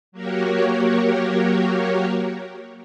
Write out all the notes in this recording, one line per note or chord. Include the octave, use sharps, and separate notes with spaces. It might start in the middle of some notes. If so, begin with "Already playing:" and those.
F#3 A#3 F#4 G4 A#4 C#5